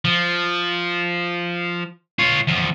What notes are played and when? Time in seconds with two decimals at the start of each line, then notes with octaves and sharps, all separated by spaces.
0.05 F3
2.19 F4 C#5
2.47 E2 F3